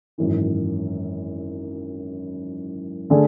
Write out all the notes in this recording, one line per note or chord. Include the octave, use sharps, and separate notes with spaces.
G#1 F#2 E3
D3 A3 D4 G#4 D5